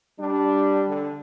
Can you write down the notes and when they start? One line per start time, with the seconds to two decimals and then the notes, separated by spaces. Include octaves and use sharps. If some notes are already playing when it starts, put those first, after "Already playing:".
0.19 G3 D4
0.89 D3